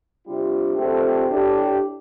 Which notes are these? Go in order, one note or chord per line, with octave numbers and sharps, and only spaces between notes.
C3 G3 D4 F4
F2 D3 A3 C4 G4
A2 A3 D4 G4